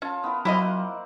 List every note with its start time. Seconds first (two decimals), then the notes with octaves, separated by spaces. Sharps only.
0.02 C#4 F4 A5
0.24 B3 E4 A#4
0.45 F#3 A#3 C4 E4 F4 D#5
0.62 F#5